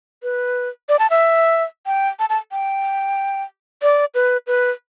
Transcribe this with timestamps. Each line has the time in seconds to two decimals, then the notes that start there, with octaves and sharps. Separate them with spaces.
0.23 B4
0.89 D5
0.99 A5
1.10 E5
1.86 G5
2.19 A5
2.30 A5
2.52 G5
3.82 D5
4.15 B4
4.47 B4